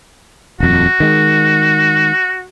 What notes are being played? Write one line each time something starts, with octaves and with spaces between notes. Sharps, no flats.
D#1 F2 F#4
D#3 G#3